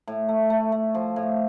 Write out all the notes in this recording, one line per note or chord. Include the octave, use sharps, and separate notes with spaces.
A2
A3
A3
A3
F3
A2